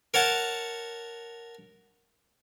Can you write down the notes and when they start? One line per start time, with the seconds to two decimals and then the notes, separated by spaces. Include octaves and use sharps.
0.14 A#4 C#5 F#5 A5